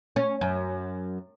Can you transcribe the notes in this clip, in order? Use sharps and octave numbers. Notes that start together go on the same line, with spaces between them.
C#4
F#2